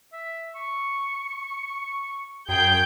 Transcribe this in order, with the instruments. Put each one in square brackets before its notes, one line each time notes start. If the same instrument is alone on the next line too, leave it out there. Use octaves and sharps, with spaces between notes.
[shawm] E5
C#6
[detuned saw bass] F#2 [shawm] G#4 [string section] G5 G6